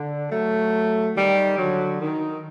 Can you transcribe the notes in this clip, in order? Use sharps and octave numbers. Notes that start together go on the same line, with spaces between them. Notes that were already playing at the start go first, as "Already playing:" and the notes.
Already playing: D3
F#3 A3
D#3 G3
D3 F#3
D#3